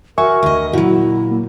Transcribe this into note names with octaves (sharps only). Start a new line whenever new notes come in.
F#4 A#4 E5 G#5 C#6
D2 D#5
A#2 F#3 E4 F#4
A#3